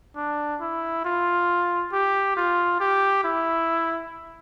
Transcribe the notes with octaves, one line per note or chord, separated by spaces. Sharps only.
D4
E4
F4
G4
F4
G4
E4